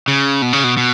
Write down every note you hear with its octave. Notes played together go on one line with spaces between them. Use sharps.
C#3
B2
C#3
B2
B2